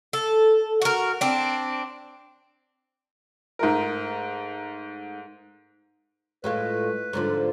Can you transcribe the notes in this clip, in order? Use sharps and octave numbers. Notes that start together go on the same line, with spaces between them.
A4
F#4 A#4
C4 D4
G#2 A3 A#4
A2 G#3 F4 B4
G#2 D3 F3